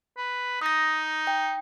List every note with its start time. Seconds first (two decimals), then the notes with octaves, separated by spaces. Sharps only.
0.17 B4
0.62 D#4 D#6 A#6
1.27 G5